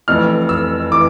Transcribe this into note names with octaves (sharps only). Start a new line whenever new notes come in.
F1 F2 E3 F6
E6
E3 D6